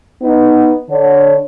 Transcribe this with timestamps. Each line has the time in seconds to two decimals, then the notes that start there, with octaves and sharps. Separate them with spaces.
0.21 B3 D#4
0.89 D3 C#5